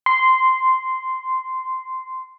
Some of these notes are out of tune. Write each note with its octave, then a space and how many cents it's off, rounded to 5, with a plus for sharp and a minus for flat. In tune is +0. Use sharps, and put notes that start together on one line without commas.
C6 -10